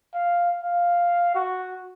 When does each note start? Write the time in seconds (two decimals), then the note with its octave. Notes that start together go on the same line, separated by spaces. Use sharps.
0.14 F5
0.64 F5
1.35 F#4